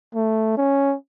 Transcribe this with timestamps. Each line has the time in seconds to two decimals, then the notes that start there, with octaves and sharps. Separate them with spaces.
0.15 A3
0.58 C#4